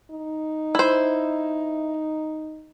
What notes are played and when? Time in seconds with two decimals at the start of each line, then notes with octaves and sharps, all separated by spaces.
0.11 D#4
0.75 E4 C5